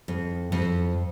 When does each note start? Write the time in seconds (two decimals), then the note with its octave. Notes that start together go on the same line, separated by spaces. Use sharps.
0.08 F2
0.52 F2